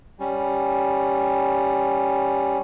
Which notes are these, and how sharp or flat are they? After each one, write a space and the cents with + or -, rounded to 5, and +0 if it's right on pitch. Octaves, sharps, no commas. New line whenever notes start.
G3 +0 C#4 +0